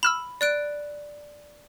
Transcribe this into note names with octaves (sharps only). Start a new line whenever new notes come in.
B5 E6 F6 E7
D5 F#6 D7